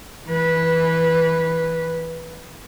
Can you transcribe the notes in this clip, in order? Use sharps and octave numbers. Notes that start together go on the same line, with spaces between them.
E3 B4